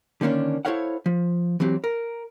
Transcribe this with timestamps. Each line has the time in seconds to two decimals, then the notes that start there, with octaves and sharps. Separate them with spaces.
0.21 D3 D#3 A#3 C#4 D4
0.65 E4 A4 C5 C#5 F5 F#5
1.06 F3
1.60 E3 F#3 C4 G4
1.84 A#4